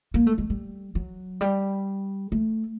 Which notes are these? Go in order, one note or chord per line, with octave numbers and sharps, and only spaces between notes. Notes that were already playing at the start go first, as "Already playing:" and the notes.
A#3
A3
G#3
G3
F#3
G3
A3